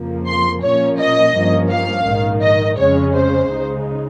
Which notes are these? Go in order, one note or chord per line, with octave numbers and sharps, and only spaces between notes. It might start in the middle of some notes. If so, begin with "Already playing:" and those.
Already playing: F2 C#3 F3 A#3
C6
A#2 F3 A#3 C#4 C#5
D#5
G2 F3 A#3 C#4
F5
A#1 G#2 D#3
D#5
F2 C#3 G#3 C#4 C#5
C5
C#2 C#3 G#3 D#4